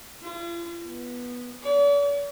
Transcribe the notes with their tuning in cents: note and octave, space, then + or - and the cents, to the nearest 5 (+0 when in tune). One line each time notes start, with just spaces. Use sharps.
F4 -45
B3 -10
D5 -45